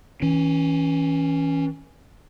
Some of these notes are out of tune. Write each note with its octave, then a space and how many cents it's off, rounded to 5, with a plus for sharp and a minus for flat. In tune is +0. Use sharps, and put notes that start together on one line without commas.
E3 -30 C#4 +0